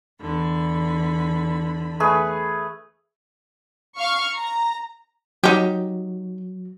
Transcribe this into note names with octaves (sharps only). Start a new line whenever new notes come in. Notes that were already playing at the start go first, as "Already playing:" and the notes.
E2 D3 B5
A3 G#4 B4
F5 C#6 F6
A#5
F#3 D#4 G4